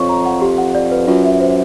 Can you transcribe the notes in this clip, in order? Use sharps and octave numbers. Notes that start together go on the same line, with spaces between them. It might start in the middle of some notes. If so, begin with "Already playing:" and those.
Already playing: F2 C#5 C#6
A#5
F#5
G4
F#5
D5
B4
F#2 F4
E5
C5